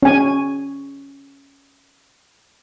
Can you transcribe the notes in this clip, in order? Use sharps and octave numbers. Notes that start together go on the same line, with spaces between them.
C#4 G#5